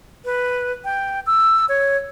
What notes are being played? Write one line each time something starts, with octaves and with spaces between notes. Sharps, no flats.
B4
G5
E6
C#5